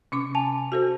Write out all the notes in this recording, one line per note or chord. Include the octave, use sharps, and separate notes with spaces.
C3 C#4 D6
G#5 A5 F7
F#4 A4 C5